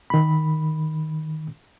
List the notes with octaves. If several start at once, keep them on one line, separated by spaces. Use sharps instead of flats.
D#3 B5